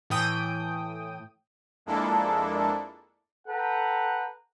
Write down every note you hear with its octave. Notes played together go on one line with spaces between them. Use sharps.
A2 E3 G5 D#6
F2 G#3 A#3 D4 E4 A4
A4 B4 F#5 G5 A#5